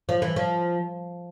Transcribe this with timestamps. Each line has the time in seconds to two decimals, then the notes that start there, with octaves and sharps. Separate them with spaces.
0.09 F3
0.22 E3
0.36 F3